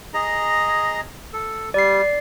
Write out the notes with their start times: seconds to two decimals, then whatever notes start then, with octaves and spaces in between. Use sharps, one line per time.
0.14 G#4 D#5 A#5
1.33 A4
1.74 G3 D5 C7